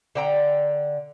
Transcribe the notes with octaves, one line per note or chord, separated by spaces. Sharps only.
D3 G5 A#5